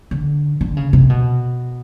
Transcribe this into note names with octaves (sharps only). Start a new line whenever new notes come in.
D3
D3
C#3
C3
B2